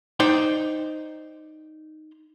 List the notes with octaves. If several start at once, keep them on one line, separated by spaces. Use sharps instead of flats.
D#4 C5 D5 G5